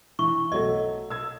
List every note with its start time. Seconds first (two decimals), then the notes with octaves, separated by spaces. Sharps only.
0.19 E3 C#6
0.52 B1 F#3 A3 D#5
1.10 E6 G#6